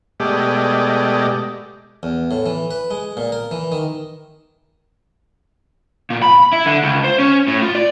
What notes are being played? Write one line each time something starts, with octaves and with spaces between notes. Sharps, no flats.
B2 G#3 A3 G4 D5 D#5
E2
A2
E3
B4
G#3
A#2
A#4
E3
D#3
A#2
B5
E4
D3
C#2
C5
C#4
A2
F4
D5